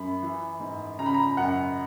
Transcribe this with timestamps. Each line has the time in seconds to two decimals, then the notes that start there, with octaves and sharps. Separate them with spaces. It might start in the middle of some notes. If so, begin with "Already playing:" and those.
Already playing: F#2 B5
0.23 E3
0.60 G#2
0.99 C#3 A#5
1.06 B5
1.14 A#5
1.37 F#2 F#5